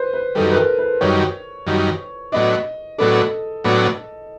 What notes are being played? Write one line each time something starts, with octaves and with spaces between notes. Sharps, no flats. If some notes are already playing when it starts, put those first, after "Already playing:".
Already playing: B4 C5
B4
F#2 D#3 G3 A4
B4
A#4
B4
F#2 D#3 G3 C#5
F#2 D#3 G3
A2 F#3 B3 D4 D#5
A2 F#3 B3 D4 A4
A2 F#3 B3 D4